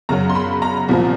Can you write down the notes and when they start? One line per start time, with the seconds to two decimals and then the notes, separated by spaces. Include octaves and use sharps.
0.09 F#2 C#3 F#3 A#5
0.29 C6
0.35 B5
0.62 A#5
0.89 C2 A#2 F3